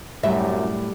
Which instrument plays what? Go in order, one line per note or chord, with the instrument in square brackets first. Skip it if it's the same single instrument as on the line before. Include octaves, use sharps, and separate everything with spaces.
[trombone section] C2 F#2 [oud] A2 [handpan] F#3 G3 G4 [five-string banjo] E5